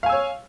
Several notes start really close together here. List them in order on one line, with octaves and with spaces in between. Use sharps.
F5 G#5 E6 C#5